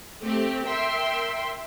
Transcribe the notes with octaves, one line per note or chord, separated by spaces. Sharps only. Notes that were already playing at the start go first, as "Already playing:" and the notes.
A3 C4 G4
A#4 E5 G5 C6